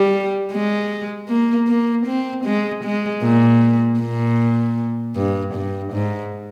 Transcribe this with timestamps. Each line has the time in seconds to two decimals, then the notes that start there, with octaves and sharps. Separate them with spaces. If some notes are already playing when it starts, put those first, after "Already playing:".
Already playing: G3
0.52 G#3
1.29 A#3
1.68 A#3
2.07 C4
2.45 G#3
2.84 G#3
3.23 A#2
4.00 A#2
5.16 G2
5.55 G2
5.93 G#2